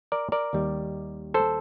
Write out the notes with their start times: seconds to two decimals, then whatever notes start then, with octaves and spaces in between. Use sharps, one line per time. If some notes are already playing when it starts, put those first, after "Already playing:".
0.12 A#4 D5
0.32 A#4 D5
0.53 D#2 D#3 G3
1.34 A4 C5